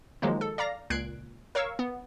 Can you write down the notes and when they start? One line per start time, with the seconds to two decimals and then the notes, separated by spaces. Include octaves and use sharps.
0.22 D#3 F3 F#3 G#3 A#3 D#4
0.41 A4
0.58 D5 F5 A#5 A#6
0.90 C#2 A#2 F#6 G#6 C7 D7
1.55 A#4 C#5 F5 C#6 E6
1.79 B3